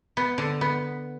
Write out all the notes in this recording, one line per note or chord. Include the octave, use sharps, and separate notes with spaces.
B3
D3
B3